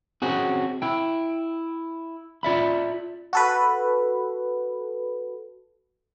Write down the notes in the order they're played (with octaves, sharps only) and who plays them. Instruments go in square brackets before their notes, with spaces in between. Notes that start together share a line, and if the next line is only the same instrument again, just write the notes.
[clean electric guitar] C4 C#4 F#4 G#4
E4 G5
F4 D5 E5 B5
[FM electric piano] F#4 A4 B4